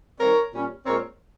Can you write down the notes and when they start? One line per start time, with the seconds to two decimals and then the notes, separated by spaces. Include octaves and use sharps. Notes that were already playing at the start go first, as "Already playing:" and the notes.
0.19 D#3 G3 C4 A#4 C#5
0.52 A#2 G3 C#4
0.84 A#2 G#3 C4 A#4 C#5